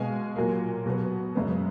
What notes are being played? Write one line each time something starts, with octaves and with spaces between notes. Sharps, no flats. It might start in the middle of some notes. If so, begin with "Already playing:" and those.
Already playing: B2 G#3 B3 F5 G#5
A#2 F#3 A#3
B2 F#3 B3
F#2 C#3 G#3 B3